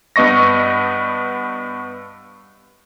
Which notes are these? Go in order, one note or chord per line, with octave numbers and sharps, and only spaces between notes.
G2 B3 D#5 C#6 A#6